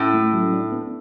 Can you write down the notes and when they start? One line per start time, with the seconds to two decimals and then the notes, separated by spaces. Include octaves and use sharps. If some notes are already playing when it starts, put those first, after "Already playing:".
Already playing: A2 C#4
0.14 A3
0.33 F#3
0.53 D4
0.72 B3